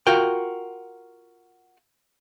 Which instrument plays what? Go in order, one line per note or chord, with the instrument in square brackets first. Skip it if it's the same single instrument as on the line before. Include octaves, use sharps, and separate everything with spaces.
[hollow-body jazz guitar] F4 F#4 A#4 G5